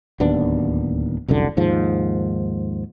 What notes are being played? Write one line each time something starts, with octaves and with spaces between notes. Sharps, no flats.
D1 D#2 B3 D4
F1 C2 F#2 D3
D#2 G#2 F3